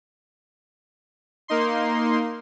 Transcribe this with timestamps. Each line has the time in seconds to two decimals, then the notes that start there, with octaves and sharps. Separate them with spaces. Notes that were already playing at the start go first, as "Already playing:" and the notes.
1.48 A#3 D#4 C6